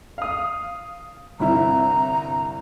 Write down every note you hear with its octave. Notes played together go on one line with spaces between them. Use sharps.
F5 D#6
G1 C2 E4 A#5